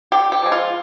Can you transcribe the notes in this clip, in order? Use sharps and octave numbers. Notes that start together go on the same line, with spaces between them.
D3 G4
G4
F3 G#3
F4